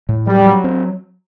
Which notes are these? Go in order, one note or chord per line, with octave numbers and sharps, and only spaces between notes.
A2
F#3 G3
F#3
C4